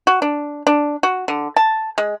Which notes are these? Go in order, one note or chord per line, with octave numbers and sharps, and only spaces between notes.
F#4
D4
D4
F#4
D3
A5
G#3